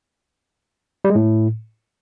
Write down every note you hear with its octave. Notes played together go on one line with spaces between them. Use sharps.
G3
G#3
A2